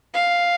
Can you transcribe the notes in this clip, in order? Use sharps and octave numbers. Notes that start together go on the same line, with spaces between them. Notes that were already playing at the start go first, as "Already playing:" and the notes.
F5